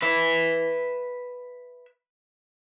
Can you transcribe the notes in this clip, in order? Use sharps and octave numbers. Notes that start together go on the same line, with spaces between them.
B4 E5